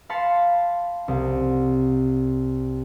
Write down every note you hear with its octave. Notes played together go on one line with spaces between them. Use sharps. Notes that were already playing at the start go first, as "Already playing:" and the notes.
F5 A5 B5 C6 A6 C#7
C2